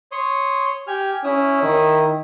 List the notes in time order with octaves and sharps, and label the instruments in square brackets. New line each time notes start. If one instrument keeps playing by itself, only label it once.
[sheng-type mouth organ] C#5 C6 D#6
G4 G#5 F6
[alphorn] C#4 [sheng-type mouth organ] E4 D#6 E6
[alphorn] D#3